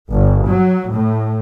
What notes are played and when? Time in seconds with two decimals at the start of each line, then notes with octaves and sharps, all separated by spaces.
0.10 G1
0.48 F#3
0.91 A2